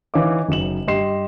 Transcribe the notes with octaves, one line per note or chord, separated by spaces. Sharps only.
E3 D#4 C#5 F5 D6
F#1 F#3 D#4 E7 F#7
G2 G4 D#5 C6 C7 E7